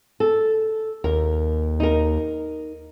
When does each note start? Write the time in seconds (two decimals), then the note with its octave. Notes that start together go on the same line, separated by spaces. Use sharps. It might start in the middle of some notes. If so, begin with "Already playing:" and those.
0.20 A4
1.04 D#2 A#4
1.80 D#4 A#4